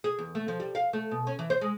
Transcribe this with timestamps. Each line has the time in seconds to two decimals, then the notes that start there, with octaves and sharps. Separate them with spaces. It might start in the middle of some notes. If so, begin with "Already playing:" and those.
0.04 G#4
0.19 E2
0.35 A3
0.48 F3
0.60 G3
0.75 F5
0.93 A3
1.11 B2
1.27 C#4
1.39 E3
1.50 C5
1.61 G#3